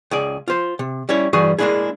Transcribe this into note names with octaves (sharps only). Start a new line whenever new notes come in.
C#2 G#4 D5
F4 C5
C3
G3 C#4 E4 C#5
G2 E3 G3 F#4 G#4 G#5
G#3 A#3 C4 D4 E4 G#4